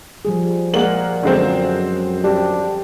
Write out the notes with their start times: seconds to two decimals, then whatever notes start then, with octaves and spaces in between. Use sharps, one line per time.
0.25 F3 G3 G#4
0.74 A#2 G#3 A#3 A#4 F#5 F#7
1.23 F#2 D3 G#3 C4
2.24 G3 D4 G4